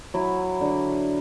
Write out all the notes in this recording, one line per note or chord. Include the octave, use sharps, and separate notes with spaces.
F#3 E4
D3